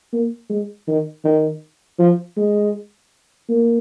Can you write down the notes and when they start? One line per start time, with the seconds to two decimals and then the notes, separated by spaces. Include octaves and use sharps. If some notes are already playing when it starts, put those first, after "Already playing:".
0.12 A#3
0.50 G#3
0.87 D#3
1.24 D#3
1.99 F3
2.37 G#3
3.49 A#3